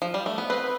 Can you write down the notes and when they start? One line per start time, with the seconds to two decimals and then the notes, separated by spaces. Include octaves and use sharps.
0.02 F3
0.14 G3
0.26 A3
0.38 B3
0.50 C4 B4